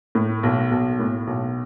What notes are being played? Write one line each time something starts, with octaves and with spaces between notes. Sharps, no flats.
A2
B1
B1
A2
B1